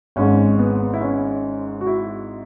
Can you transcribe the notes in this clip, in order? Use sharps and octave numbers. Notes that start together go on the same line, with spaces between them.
G#1 G#2 G#3 C#4
B3
E4
C#4
F#4
E4